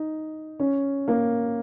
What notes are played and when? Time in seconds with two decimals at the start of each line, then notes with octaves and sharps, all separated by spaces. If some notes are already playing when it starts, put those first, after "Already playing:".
Already playing: D#4
0.60 C#4
1.08 A#3